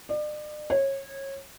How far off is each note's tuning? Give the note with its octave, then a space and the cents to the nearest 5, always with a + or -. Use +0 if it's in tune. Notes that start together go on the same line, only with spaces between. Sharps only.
D5 +40
C#5 -25